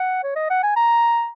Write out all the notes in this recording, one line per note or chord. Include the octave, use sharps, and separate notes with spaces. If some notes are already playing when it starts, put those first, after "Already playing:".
Already playing: F#5
C#5
D#5
F#5
G#5
A#5